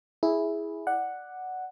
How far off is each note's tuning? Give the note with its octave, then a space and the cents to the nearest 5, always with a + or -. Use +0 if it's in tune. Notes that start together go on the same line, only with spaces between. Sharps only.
E4 -5 G#4 +0
D5 +10 F#5 +0